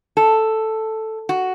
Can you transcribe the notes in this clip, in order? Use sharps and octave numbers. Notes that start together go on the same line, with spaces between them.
A4
F#4